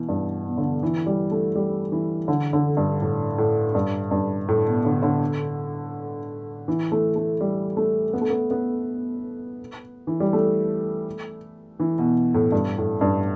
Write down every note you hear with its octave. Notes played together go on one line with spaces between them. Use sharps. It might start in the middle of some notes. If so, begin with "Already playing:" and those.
Already playing: B2 E3
G2
B2
D3
E3
G3
A3
G3
E3
D3
D3
G2
A2
A2
G2
G2
A2
B2
D3
D3
E3
A3
A3
G3
A3
B3
A3
B3
B3
E3
G3
A3
E3
B2
A2
G2
A2
G2